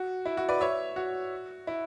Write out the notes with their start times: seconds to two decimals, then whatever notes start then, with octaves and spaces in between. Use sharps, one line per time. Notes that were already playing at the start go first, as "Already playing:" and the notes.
Already playing: F#4
0.25 E4
0.37 F#4
0.49 B4 D5
0.61 C#5 E5
0.96 F#4
1.67 E4